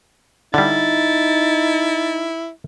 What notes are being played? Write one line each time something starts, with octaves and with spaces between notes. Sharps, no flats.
D3 G3 D#4 E4 A6